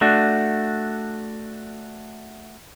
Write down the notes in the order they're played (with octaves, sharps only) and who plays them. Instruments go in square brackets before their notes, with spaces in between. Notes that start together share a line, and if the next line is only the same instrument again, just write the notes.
[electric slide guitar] A3 D4 F#4